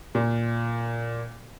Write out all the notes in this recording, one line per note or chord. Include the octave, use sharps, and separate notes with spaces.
A#2